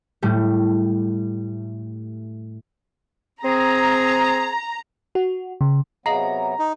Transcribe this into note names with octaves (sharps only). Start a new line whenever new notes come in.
A2 G3 A3
C4 G#4 A#5
F#4
C#3
C3 F#3 B3 G#4 D#5 F5 A#5
D#4